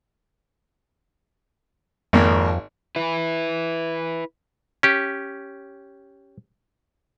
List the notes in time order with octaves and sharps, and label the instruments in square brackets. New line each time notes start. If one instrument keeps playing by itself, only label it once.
[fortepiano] G#1 A#3 [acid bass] F2
[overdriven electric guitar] E4 B4
[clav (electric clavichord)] C#4 G4